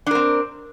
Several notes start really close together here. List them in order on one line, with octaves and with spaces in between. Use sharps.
D4 A#4 C4